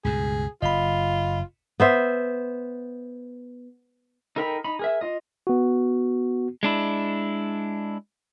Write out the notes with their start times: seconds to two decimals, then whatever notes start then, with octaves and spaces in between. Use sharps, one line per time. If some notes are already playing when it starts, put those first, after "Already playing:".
0.05 C#2 G2 B2 G#4
0.62 F#1 F4 D#5 B5
1.80 B3 C5 E5
4.36 D#4 A4 A#4 G5 B5
4.64 D#4 B5
4.79 G#4 A#4 E5
5.01 F4 D#5
5.47 B3 F#4
6.63 G#3 D4 E4